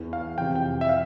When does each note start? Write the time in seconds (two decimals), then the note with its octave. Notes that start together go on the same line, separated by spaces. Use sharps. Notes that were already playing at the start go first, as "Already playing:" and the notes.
Already playing: E2 E3
0.13 F5
0.38 F2 C3 E3 G5
0.56 G5
0.81 E5
0.89 F5